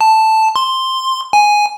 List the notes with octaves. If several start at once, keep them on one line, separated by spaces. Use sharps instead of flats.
A5
C6
G#5